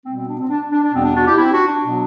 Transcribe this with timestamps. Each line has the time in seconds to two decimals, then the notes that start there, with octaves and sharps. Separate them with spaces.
0.05 B2 G3 B3 C4
0.17 C4
0.28 D4
0.39 C4
0.49 D4
0.72 D4
0.83 D4
0.94 E2 B2 G3 B3 C4
1.05 D4
1.16 D4 F#4
1.27 E4 G4
1.38 C4 E4
1.52 D4 F#4
1.68 D4
1.83 B2 F#3 B3